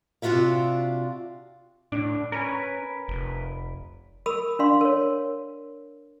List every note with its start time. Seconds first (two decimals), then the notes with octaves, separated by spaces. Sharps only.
0.22 C3 D4 F4 F#4 E5 F5
1.92 A2 D4
2.32 C#4 A#4 B4 G#5
3.08 F1
4.26 A#4 B5 D#6 E6
4.59 D4 D5 F5 C6
4.81 A#4 C#5